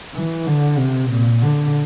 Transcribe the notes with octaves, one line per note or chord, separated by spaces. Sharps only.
E3
D3
C3
A#2
D3